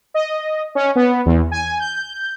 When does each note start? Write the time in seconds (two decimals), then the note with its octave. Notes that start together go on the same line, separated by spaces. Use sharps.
0.14 D#5
0.75 C#4
0.96 B3
1.26 E2
1.51 G#5
1.80 G6